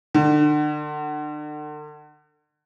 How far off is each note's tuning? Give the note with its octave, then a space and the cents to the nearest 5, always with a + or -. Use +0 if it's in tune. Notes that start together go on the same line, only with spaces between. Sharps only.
D3 +40